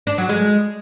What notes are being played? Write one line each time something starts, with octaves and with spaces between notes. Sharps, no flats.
D4
F#3
G#3